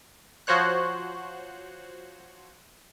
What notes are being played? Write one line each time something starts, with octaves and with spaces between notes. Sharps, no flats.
F3 F#4 C5 C#5 F#6